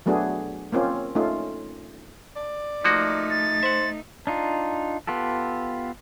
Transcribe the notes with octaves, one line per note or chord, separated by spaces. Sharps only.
F#3 A3 B3 D4 F#4 G#4
A#3 C4 C#4 F4
A3 C#4 D#4 F4
D5
F3 A3 A#3 D#4 F#4
A6
C5 E5 F#5
D4 D#4 F4
B3 F4 G4 A4